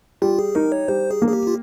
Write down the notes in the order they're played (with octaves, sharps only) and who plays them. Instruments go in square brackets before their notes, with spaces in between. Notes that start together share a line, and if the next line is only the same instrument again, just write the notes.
[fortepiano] G3 [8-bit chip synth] F4
[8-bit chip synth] G#4
[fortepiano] D#4 [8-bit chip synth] A#4
[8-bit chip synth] C#5
[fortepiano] G3 [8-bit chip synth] C5
[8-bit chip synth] G#4
[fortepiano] A#3
[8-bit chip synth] G#4
G4
F4